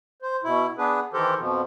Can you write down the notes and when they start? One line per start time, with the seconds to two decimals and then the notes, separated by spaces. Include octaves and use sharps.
0.22 C5
0.44 B2 E4
0.78 B3 D4 G#4 B4
1.13 D#3 E3 G4 A4 A#4 C5
1.38 F2 B2 F3